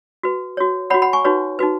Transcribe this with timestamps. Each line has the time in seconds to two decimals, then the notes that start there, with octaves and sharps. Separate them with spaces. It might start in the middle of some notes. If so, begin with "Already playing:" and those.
0.23 F#4 B4
0.57 F#4 C#5
0.90 C#5 F#5 B5
0.94 F#4
1.02 F#5 B5
1.13 G#5 C#6
1.25 D#4 F#4 B4 C#5
1.59 D#4 F#4 B4